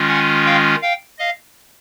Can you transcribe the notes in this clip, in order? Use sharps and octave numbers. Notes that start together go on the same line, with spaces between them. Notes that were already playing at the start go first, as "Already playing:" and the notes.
Already playing: D#3 G#3 C#4 F4
F#5 G#5
F5 G5
F5 G5
D#5 F5